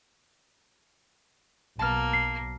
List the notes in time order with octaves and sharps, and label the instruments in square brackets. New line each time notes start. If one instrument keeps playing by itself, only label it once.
[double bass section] B1 [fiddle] A#3 [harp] A5 F6
[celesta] C7